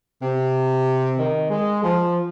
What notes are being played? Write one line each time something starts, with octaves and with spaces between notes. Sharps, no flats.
C3
D#3
G#3
F3